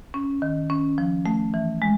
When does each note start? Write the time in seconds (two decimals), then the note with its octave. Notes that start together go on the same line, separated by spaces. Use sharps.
0.14 C#4
0.42 D#3
0.70 C#4
0.98 F3
1.26 A3
1.54 E3
1.82 G#3